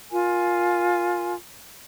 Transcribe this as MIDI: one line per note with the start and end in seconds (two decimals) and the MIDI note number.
0.11 1.33 65
0.11 1.33 70
0.11 1.33 80